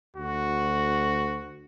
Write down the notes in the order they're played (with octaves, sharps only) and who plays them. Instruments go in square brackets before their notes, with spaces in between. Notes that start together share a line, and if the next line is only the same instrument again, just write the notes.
[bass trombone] D2 [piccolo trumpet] F#4